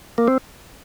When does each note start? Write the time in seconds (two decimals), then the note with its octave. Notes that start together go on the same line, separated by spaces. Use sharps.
0.18 A#3
0.28 C4